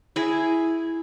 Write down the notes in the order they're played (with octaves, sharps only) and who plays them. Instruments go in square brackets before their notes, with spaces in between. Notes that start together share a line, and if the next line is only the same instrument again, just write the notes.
[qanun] E4 G#4